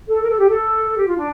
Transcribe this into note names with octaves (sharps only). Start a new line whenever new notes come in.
A4
A#4
A4
G4
A4
G4
F4
D4